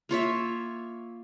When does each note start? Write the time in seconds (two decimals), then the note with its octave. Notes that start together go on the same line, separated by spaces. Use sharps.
0.09 A#3 F4 C#5 E5